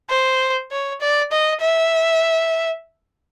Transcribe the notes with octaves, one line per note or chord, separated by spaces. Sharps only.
C5
C#5
D5
D#5
E5